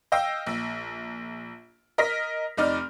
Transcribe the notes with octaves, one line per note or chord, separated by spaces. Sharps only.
D#5 F5 G5 E6
A#1
A#4 D#5 F6 A#6 B6
F1 D#4 D5 F6